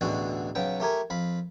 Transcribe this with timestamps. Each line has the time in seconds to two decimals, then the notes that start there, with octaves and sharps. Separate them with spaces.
0.01 A1 D2 B2 D3 G#3 F#4
0.55 B1 C#3 B3 G5
0.80 A3 G4 A#4 G#5
1.10 F2 F5 B5